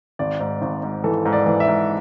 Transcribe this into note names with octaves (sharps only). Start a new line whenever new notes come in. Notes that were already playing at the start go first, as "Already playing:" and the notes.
G#1 D5
G#2
G#1
G#2
E3 A4
G#2
D5
E3
E5
G#2